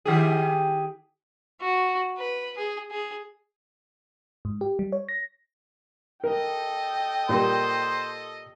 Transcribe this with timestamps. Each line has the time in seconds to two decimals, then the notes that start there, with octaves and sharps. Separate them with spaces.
0.05 D#3 G4 G#4
1.61 F#4
2.18 B4
2.58 G#4
2.91 G#4
4.45 G#2
4.61 G4
4.79 G3
4.92 C#5
5.09 A#6
6.24 A4 A#4 D#5 G5
7.29 A#2 G3 A#3 C5